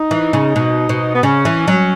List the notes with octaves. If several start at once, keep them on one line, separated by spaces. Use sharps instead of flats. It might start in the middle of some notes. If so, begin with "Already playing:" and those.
Already playing: D#4
E3
C#3
B2
B2
B3
C#3 C#4
E3
F#3